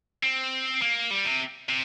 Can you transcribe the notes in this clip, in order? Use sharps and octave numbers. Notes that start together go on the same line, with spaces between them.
C4
A#3
G3
C3
C3